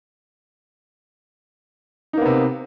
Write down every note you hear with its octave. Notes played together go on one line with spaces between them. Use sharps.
C3 A#3 B3 D#4